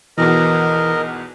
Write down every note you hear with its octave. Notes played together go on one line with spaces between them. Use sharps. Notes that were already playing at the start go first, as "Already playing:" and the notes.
B1 E2 B2 E3 A#4 D#5